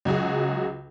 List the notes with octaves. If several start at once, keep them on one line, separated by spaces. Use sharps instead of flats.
C#2 F#3 F#4 G#4